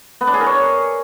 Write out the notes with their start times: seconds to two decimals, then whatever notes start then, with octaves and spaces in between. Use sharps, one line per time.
0.21 B3
0.27 D4
0.34 G#4
0.40 A#4
0.46 C#5